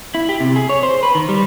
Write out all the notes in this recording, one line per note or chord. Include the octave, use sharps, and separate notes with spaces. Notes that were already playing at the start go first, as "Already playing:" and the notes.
E4
G4
C3
G#4
C#5
C5
B4
D#3
G3